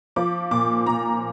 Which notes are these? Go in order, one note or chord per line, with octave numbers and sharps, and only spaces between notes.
F3 D6
A#2 D6
A#2 A#5